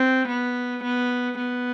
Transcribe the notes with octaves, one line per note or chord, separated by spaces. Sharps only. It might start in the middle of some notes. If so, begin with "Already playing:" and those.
Already playing: C4
B3
B3
B3